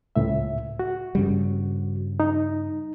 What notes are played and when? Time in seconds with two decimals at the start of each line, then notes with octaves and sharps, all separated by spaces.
0.16 C#2 A2 E5
0.79 F#4
1.15 G2 C#3 G3
2.20 D#4